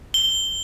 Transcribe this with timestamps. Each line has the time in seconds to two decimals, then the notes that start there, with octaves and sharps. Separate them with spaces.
0.14 G7